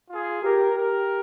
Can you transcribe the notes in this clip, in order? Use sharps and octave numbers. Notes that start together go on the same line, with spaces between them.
F4 G#4
G4 A#4
G4 A#4